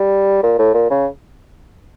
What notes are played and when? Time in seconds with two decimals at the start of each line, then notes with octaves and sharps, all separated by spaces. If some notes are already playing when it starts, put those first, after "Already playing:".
Already playing: G3
0.43 A#2
0.59 A2
0.74 A#2
0.90 C#3